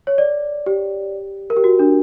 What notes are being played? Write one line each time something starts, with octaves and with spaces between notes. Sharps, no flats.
C#5
D5
G4
A#4
G4
F#4
D4